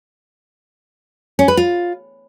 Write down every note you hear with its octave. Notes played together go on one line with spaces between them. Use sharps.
C#4
B4
F4